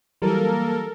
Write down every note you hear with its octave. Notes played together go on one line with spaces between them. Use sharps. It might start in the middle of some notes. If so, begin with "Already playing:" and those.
E3 F#3 G3 A#3 A4 A#4